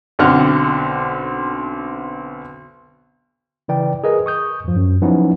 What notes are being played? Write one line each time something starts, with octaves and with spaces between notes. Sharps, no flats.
B1 D3 C4 F#5 F6
C#3 E3 D5 G5
G#4 A#4 B4 D#5
C#6 D#6 G6
E2 G2 F3
F#2
F3 F#3 B3 C#4 D#4 E4